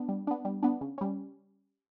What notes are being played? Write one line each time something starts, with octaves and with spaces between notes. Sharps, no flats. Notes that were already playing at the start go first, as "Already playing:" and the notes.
Already playing: B3 D4
G3
B3 D4
G3
B3 D4
C#3
G3 C#4